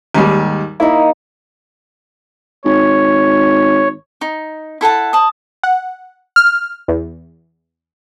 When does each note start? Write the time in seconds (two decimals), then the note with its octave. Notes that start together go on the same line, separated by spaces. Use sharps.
0.14 D#2 G#2 G3
0.80 A#3 D#4 E4
2.65 G#1 C#5
4.21 D#4
4.81 E4 A4 F#5 A5
5.13 A5 D#6
5.63 F#5
6.36 F6
6.88 E2